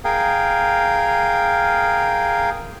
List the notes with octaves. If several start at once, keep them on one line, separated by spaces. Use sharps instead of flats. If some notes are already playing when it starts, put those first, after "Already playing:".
G#4 A#4 F5 G5